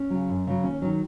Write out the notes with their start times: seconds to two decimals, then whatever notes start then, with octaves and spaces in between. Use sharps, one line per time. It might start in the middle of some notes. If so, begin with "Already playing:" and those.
Already playing: C#4
0.10 C#3 F#3
0.29 F#2
0.47 C#3 F#3
0.64 D#2 C#4
0.82 D#3 F#3